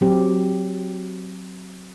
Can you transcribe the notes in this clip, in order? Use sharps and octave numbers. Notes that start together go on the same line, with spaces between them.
F#3 C4 G4